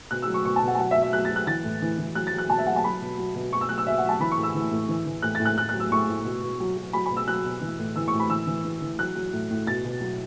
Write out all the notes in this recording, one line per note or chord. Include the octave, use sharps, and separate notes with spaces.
B2 F#6
E6
F#3
C#6
B2 C#6
A5
B2 F#5
A5
F#3 F#5
E5
B2
E5
F#3 F#6
A6
F#3
F#6
E3 A6
A2
E3
E3
F#3 F#6
A6
F#3
F#6
B2 A5
E5
F#3 F#5
A5
F#3 B5
B2
F#3
B2
B2 C#6
E6
F#3 F#6
E6
B2 E5
F#5
F#3 A5
E3 B5
C#6
A2
E6
E3
A2
E3
E3
A2 F#6
A6
A2
F#6
A2 F#6
F#6
F#3
E6
A2 C#6
A2
B2
B2
F#3
F#3
F#3 B5
B5
B2
E6
F#3 F#6
B2
E3
A2
E3 E6
C#6
A2
B5
E3 E6
E3
E3
E3
F#3 F#6
F#3
A2
A2
B2 A6
B2
F#3